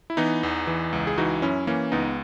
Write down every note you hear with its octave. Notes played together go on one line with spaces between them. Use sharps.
E4
E3 B3 D#4
E2
E3
C#2
G#4
E3 D#4 F#4
F#2 C#4 E4
E3 A#3 C#4
C#2 B3 D#4